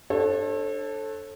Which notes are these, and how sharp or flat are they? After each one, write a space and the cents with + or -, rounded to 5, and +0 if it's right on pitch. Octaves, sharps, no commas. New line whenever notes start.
D4 +20 A4 +0 C#5 -45